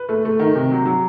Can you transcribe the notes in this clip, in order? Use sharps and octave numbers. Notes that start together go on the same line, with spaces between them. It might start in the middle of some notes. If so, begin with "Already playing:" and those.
Already playing: B4
A3
A3
D#3
C3
F#3
F#3